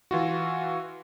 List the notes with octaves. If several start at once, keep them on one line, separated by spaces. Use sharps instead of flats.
E3 F4 F#4